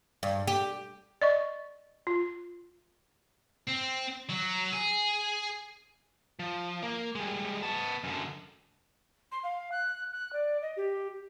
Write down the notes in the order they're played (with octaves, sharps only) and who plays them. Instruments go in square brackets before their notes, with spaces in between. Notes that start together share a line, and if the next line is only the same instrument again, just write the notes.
[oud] G2
G4
[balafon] D5 D#5 C#6
F4
[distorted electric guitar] C4
F#3
G#4
[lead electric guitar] F3
A#3
G3 G#3
B3 A5
F#2 D3
[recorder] C6
F5
F#6
F#6
D5
D#5
G4